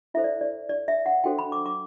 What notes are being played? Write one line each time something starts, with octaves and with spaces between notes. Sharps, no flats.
E4 A4 C5 E5
D5
D5
D5
E5
F#5
D4 F#4 A4 C5 G5
B5
D6
D6